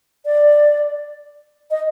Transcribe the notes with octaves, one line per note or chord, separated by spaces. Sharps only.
D5
D#5